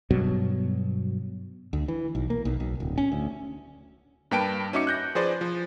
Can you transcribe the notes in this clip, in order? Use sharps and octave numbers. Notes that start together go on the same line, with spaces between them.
G2 B2 F#3
D2
E3
B1
A#3
B1
B1
D1
C#4
D2
G2 A#3 B4 G5 A5 D7
C#4 D#4 F#4 E5 D6 C#7
F#6 G6 A#6
F3 G#4 B4 C5 D5
F3